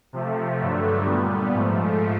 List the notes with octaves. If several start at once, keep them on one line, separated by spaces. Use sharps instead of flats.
C3 F3 A3
G2 D3 F#3 A3
A#2 G3 B3
G#2 F3 A3